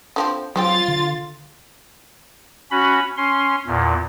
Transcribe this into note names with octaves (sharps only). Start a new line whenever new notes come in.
D3 F3 C4
F#3 G#3 C4 F4 G4 A6
D3
C#4 F#4 B5
C#4 C6
E2 A#2